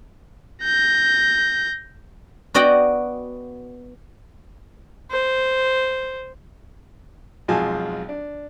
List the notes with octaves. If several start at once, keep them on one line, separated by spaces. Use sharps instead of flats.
G6 A#6
B3 F#4 D5 D#5 F#5 G5
C5
B1 F2 G#3 F4 G#5 A5
D4